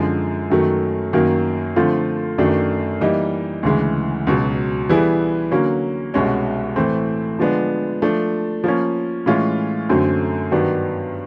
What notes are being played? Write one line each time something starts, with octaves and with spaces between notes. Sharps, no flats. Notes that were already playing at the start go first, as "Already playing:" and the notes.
Already playing: F#2 D3 F3 G#3
F#2 D#3 F#3 A3
F#2 D#3 F#3 A#3
D3 F3 A3 C4 F4
F#2 D#3 F#3 A3 D4
E3 G3 A#3 D#4
D2 C#3 E3 G#3
C#2 B2 F#3
E3 G3 B3 E4 G#4
D3 F#3 A#3 C#4
C2 B2 G#3 C#4 F#4
A2 E3 A3 C4
D3 F3 G#3 B3 D4
F3 A3 D4
F3 A#3 C#4
A2 E3 G#3 C#4 F4
F#2 D3 F#3 A3 C4
G2 D#3 F#3 B3 D4